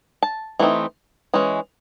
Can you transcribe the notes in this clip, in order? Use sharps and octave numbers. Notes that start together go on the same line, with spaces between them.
A5
E3 A3 C4 D#4
E3 G#3 C#4